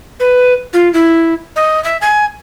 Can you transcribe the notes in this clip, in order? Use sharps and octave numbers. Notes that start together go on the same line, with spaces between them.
B4
F4
E4
D#5
E5
G#5